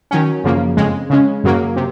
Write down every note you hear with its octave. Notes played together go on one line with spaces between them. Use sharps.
D#3 F#3 C#4
F#2 C#3 F3 A#3
F2 C#3 G#3
C#3 G#3 C#4
F#2 C#3 F#3 A#3
C3